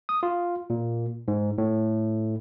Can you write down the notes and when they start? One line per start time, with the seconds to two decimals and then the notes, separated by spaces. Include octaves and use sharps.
0.09 D#6
0.23 F4
0.70 A#2
1.28 G#2
1.58 A2